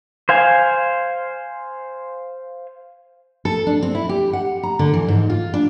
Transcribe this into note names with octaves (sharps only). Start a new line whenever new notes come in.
C5 F5 G#5
A4
D4
C4
E4
G4
F#5
A#5
D3
E3
G#2
F4
D4